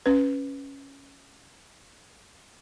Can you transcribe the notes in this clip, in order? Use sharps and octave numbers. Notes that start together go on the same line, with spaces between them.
C#4 B4